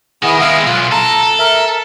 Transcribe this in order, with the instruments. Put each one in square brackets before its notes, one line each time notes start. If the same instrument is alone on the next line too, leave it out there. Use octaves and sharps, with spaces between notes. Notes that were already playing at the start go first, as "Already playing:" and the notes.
[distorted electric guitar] D#3 [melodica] B3 E4 G#4
[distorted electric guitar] G#3 C4 [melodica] E5 F5 E6
[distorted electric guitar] B1 [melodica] F4
[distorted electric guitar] A4 [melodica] A5 A#5
[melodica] A#4 E5